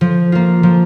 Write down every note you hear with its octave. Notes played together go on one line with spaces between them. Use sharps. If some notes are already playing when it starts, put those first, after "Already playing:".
F3
A#3 F4
F3